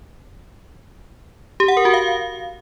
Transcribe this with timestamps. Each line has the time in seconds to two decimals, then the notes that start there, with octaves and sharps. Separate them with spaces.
1.60 G4
1.68 F#5
1.77 A#4
1.85 F#4
1.94 F5